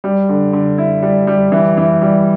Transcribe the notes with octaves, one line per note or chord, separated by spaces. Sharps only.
G3
D3
D3
E4
G3
G3
E3
E3
G3